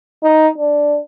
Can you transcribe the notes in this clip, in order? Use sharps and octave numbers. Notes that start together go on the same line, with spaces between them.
D#4
D4